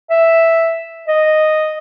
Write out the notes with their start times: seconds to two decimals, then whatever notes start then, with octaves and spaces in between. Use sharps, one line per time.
0.10 E5
1.08 D#5